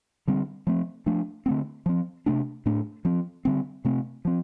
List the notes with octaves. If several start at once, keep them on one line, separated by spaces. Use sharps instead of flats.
D3 G3 C4
F3 A3 C4
F3 A3 D4
D3 A3 C4
F3 C4
C3 A3 D4
A2 A3 D4
F3 C4
D3 G3 C4
C3 A3 C4
F3 C4